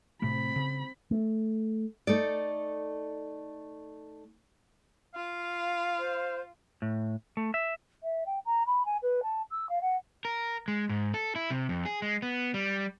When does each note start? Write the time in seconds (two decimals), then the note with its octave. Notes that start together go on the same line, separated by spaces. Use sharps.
0.22 A2 C3 A3 C4 B5
0.56 C#3
1.11 A3
2.07 A3 D#4 D5
5.14 F4 F5
5.99 C5
6.82 A2
7.37 A3
7.54 E5
8.03 E5
8.26 G5
8.45 A#5
8.66 B5
8.85 G#5
9.02 B4
9.23 A5
9.51 E6
9.69 F5
9.81 F#5
10.25 A#4
10.68 G#3
10.89 G#2
11.14 A4
11.36 E4
11.50 C3
11.69 F2
11.85 G#4
12.02 G#3
12.22 B3
12.54 G3